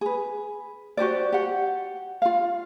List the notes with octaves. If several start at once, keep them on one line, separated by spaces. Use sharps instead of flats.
G#4 B4
F#4 G4 C5 D5
G4 F#5
F4 F5